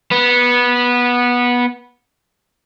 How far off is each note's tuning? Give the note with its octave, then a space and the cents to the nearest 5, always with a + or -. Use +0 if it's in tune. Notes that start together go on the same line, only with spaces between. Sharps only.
B3 -15